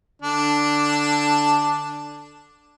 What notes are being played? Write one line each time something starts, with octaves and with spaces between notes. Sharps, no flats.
D3 D4